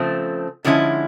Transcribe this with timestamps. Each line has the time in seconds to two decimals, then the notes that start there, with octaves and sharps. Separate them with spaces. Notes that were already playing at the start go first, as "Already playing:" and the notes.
Already playing: C#3 F3 A3 C4
0.65 D3 F3 G#3 C#4 E4